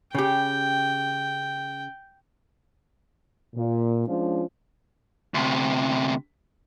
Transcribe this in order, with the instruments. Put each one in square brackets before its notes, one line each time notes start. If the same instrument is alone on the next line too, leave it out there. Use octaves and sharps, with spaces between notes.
[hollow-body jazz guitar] C#3 G4 [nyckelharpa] G5
[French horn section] A#2
F3 G#3 C#4 D4 F4
[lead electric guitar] D2 C3